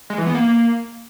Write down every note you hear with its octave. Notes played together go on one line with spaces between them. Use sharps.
G#3
E3
B3
A#3